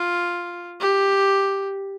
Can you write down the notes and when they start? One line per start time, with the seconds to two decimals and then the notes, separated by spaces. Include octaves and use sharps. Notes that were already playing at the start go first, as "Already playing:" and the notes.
Already playing: F4
0.80 G4